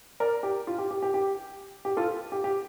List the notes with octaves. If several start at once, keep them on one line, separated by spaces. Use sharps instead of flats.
A#4 D5
G4
F4
G4
G4
G4
G4
G4
F4 A4
G4
G4